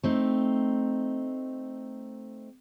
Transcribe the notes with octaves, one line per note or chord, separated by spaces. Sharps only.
A3 C4 D#4